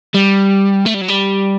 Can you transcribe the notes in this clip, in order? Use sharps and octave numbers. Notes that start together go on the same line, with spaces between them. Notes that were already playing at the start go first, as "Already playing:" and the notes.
G3
A3
G3
F#3
G3